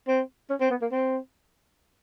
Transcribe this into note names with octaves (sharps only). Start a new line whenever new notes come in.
C4
C#4
C4
B3
A#3
C4